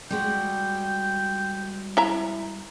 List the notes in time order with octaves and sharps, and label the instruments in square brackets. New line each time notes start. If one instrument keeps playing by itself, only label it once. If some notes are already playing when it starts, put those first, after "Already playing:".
[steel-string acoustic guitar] G3 G#3 F#4 [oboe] G5
[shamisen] E4 E5 A#5